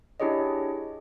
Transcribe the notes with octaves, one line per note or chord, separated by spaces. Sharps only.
D4 E4 G4 G#4 C#5 D#5